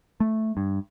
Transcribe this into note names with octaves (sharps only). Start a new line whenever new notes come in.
A3
G2